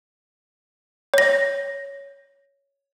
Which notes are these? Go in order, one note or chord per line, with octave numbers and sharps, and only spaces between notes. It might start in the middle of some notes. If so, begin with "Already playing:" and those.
C#5 A#6